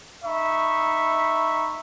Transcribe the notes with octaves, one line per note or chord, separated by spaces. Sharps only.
D#4 E5 B5 C#6